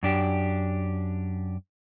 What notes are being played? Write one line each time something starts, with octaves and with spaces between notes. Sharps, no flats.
F#2 D4 G4